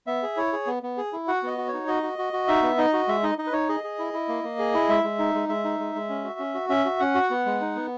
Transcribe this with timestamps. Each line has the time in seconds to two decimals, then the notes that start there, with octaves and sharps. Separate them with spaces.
0.07 B3 E5
0.23 G#4
0.37 E4 C#5
0.53 G#4
0.67 B3
0.83 B3
0.97 G#4
1.13 E4
1.28 F#4 F#5
1.43 B3 D#5
1.58 F#4
1.68 C#5
1.73 D#4
1.87 F#4 D#5
2.03 F#4
2.18 F#4
2.33 F#4
2.48 D#4 E5
2.63 B3
2.78 D#4 D#5
2.93 F#4
3.08 G#3 E5
3.23 D#4 D#5
3.38 D#4 D#5
3.47 B4
3.53 D#4 C#5
3.69 G#4 D#5
3.84 G#4
3.99 E4
4.13 E4
4.28 A#3
4.44 A#3
4.59 G#4
4.74 E4
4.89 G#3 E5
5.04 G#3
5.19 D#4
5.35 G#3
5.49 G#3 E5
5.64 D#4
5.79 G#3
5.95 G#3
6.09 C#4
6.24 F#4
6.39 C#4
6.54 F#4
6.69 C#4 E5
6.85 F#4
7.00 C#4 F#5
7.15 F#4
7.30 B3
7.46 G#3
7.61 D#4
7.76 B3